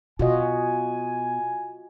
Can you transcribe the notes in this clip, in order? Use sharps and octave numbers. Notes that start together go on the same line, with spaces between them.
B2 F4 F#4 D#5 G#5